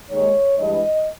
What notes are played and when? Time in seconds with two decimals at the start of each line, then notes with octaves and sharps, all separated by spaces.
0.09 D#2 D#3 G#3 C#5
0.58 G2 E3 G#3 D#5